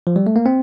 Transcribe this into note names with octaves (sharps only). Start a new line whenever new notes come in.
F3
G3
A3
A#3
C4